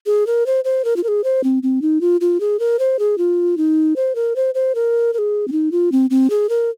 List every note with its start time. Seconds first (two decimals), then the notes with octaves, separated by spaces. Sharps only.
0.06 G#4
0.27 A#4
0.46 C5
0.65 C5
0.85 A#4
0.96 F4
1.04 A#4
1.08 G#4
1.24 C5
1.44 C4
1.63 C4
1.82 D#4
2.01 F4
2.21 F4
2.40 G#4
2.59 A#4
2.79 C5
2.99 G#4
3.18 F4
3.57 D#4
3.96 C5
4.15 A#4
4.36 C5
4.55 C5
4.75 A#4
5.13 A#4
5.18 G#4
5.48 C4
5.52 D#4
5.72 F4
5.92 C4
6.10 C4
6.30 G#4
6.49 A#4